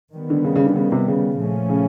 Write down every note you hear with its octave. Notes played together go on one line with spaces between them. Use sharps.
D#3 G3 B3
D3
C#3
C#3
D3
C#3
C3
C#3
A#2 F3 A3 C#4
C#3